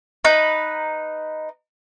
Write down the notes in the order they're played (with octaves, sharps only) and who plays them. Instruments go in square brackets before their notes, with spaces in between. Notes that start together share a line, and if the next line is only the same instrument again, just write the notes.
[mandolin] D#4 B4